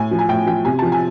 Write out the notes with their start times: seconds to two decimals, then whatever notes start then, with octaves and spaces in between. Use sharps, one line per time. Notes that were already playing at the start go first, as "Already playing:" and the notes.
Already playing: A2 G#5
0.11 F3
0.19 G#5
0.29 A2 G5
0.47 F3 G5
0.65 C3 G#5
0.79 F3 A5
0.92 G#5